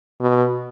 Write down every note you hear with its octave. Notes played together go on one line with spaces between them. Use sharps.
B2